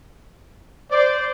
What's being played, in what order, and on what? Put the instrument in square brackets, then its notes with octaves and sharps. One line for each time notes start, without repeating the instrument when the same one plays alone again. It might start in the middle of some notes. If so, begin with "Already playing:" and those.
[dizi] C5 [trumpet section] D5